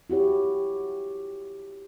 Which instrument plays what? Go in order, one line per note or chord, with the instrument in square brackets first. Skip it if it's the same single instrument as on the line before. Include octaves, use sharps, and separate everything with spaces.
[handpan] E4 F#4 G4 C#5